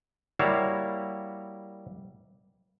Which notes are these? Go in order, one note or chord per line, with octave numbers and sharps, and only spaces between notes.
G3 A#3 E4 F#4 C#5 F5